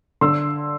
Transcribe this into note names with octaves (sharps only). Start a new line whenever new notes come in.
D3 C6 E6